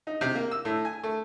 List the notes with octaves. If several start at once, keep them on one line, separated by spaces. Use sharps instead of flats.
D#4
C3
A#3
E6
A2
G#5
A3